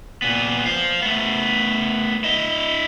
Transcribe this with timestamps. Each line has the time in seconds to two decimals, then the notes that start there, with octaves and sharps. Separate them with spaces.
0.22 A#2 B3
0.66 C5 F5
1.02 A3 B3
2.24 E4 D#5